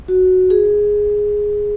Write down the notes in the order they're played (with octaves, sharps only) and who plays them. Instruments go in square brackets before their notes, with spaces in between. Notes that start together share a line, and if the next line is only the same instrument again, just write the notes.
[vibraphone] F#4
G#4